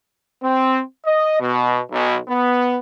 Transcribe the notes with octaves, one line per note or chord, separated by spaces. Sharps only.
C4
D#5
B2
B1
B3